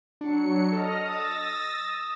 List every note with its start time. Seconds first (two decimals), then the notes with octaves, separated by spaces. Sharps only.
0.21 F#3 D4 C#7
0.72 A4 D#5 F6 A#6
1.05 D#6 E6 A6 A#6